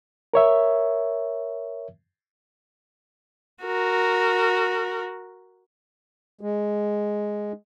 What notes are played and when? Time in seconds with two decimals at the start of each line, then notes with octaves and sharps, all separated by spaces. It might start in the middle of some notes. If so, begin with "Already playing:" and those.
0.34 A#4 C#5 E5
3.64 F#4 A#4
6.41 G#3